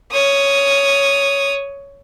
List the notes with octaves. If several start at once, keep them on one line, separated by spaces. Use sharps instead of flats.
C#5 D#6